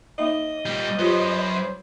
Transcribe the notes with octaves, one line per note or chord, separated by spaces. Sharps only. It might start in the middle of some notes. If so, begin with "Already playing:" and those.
A#3 D#4 D#5 E5
A#2 G3
F#2 F4 G4 B4 C5